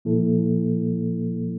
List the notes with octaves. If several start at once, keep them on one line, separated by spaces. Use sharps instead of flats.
A#2 F3 A#3 E4 A4